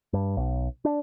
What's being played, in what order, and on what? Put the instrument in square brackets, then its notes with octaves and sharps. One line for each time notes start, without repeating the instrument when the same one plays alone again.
[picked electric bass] G2
B1
D4